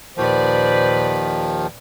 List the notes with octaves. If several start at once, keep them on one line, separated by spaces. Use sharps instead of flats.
D#2 A#2 D#3 F3 B4 C5 D5